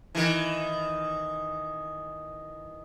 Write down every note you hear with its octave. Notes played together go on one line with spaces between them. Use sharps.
D#3 E3